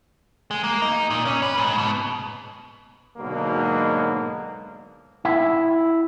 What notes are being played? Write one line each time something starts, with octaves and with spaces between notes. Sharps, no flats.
G#3
A#3
D#4
A#2
C#4
B4
G#2
B2
G#2 B2 D3 F#3 A#3
E4